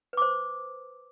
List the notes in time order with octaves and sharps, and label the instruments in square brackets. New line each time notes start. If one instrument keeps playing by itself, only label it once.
[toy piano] B4
D6
C5